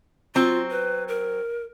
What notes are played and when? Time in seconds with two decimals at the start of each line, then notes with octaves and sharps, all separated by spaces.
0.35 F#3 C4 F4
0.70 B4
1.08 A#4